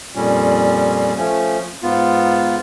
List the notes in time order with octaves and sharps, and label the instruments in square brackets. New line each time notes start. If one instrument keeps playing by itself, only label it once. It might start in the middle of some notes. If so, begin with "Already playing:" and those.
[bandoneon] F2 A#2 G3 C#4
F3 A3 C#4
G#2 B3 F4